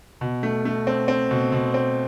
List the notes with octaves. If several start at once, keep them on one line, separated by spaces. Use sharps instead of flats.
B2
A3
A3
C4
C4
B2
B2
C4